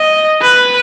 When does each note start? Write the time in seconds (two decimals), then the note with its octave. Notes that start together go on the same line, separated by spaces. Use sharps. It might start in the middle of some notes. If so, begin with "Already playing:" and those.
Already playing: D#5
0.41 B4